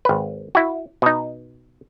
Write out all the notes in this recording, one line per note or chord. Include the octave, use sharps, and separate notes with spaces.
G#1 B4
E4 F#4
B2 D#4